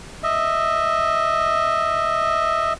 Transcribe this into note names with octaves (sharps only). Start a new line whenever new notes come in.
D#5 E5